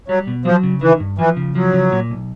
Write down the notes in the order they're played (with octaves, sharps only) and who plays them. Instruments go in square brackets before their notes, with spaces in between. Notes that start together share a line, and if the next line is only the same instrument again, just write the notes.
[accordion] F#3 [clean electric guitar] G3
[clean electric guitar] B2
[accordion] F3 [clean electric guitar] F#3
[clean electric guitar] C#3
[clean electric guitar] D#3 [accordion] E3
[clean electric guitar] G2
[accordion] E3 [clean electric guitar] F3
[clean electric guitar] C#3
[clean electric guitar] F3 [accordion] F#3
[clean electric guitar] C#3
A#2
B1